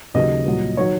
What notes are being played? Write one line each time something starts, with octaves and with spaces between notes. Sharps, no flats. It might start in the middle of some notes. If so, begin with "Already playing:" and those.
D#2 C#3 F#3 D#5
C2 A#2 F#3
D#3 F#3 C#5